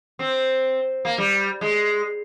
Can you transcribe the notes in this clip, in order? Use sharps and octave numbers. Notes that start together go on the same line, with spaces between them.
C4
A#3
G3
G#3